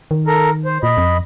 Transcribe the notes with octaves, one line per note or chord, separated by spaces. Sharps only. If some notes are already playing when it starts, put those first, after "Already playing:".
D#3
A4 A#4 A#5
C5
A#2 D#5 B5
F2